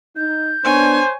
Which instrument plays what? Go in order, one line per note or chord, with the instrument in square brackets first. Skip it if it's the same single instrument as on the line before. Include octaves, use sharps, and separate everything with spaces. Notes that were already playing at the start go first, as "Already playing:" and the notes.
[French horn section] D#4 [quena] G6
[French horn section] B3 D4 [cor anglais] C5 [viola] C#5 G#5